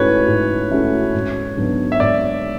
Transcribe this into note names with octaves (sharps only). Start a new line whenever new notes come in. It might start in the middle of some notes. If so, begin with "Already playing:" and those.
Already playing: G#2 E3 A3 C#4 F#4 B4 C#5
G#2
E3 A3 C#4 F#4
G#1
G#2 F#3 B3 D4
E5
G#1 D5